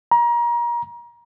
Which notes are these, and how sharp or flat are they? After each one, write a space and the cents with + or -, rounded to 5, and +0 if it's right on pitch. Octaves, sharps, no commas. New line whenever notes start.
A#5 +30